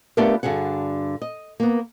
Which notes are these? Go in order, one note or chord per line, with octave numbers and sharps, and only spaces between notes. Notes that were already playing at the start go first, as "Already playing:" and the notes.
A3 B3 D4 F4 G4 A#4
G2 D3 F#4 G#4 F#5
D#5
A#3 B3